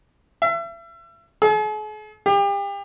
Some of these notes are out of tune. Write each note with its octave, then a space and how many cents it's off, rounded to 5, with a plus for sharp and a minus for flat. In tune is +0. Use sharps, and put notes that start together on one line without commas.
E5 +35
G#4 +45
G4 +35